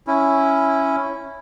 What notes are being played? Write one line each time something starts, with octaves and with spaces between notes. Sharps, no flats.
C#4 E4